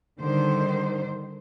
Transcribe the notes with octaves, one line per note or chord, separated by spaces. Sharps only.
D3 D#3 G3 C5